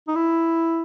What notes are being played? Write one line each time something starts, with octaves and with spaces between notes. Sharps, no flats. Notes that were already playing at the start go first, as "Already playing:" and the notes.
D#4
E4